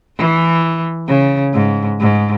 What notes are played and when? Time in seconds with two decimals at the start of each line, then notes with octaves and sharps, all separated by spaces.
0.17 E3
1.08 C#3
1.53 G#2
2.00 G#2